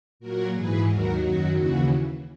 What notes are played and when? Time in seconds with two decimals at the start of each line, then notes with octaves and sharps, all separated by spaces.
0.20 A#2 F#3 F#4 A#4
0.53 G#2 E3 G#4 B4
0.87 D#2 D#3 F#3 F#4 A#4
1.21 F#2 D#3 F#3 F#4
1.55 D#2 C#3 E3 F#4